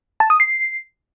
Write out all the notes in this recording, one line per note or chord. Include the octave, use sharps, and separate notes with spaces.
A5
D#6
C7